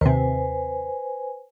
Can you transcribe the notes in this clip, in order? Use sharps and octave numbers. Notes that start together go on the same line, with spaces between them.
D#2 C3 B4 C5 G#5